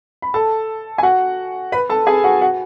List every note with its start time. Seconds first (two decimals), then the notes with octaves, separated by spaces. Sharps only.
0.22 B5
0.34 A4 A5
0.98 G#5
1.03 F#4 F#5
1.72 B4 B5
1.89 A4 A5
2.07 G#4 G#5
2.24 F#4 F#5
2.41 F#4 F#5